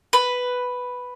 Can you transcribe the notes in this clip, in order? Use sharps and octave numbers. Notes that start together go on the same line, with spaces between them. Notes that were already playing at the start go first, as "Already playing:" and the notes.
B4